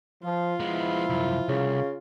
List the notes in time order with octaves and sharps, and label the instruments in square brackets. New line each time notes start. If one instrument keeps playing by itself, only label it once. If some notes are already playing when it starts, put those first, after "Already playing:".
[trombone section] F3 [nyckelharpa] F4
[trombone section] F3 E4 [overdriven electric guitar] G#3 B3
[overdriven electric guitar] C2 F#2
[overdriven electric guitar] C2 [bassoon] C#3